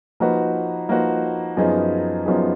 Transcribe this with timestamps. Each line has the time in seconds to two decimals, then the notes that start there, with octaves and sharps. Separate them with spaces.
0.20 F3 A#3 D#4 F#4 B4
0.89 F3 A#3 D#4 F#4 B4
1.57 F#2 F3 B3 D#4 G#4
2.26 F#2 F3 B3 D#4 G#4